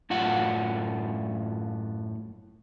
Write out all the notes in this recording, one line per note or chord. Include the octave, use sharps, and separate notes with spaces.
F#2 A2 F4 F#5